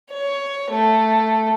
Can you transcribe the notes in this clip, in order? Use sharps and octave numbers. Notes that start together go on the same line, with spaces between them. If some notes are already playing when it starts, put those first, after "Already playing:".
C#5
A3